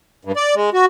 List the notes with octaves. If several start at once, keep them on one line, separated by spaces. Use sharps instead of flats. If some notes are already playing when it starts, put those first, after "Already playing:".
G2
D5
G#3
F#4